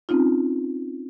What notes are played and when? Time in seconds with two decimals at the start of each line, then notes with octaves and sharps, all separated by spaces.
0.09 C4 C#4 D#4 F4